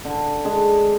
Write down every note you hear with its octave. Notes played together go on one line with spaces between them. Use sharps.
D3
G#3 D4 G#4